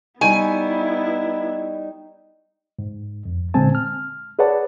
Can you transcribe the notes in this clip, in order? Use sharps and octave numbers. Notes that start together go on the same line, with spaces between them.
G3 B3 D#4 E4 G#5 C#6
G#2
F2
A#2 D3 G#3 C4 G#5 A5
F6
G#4 B4 C#5 D5 F#5 A5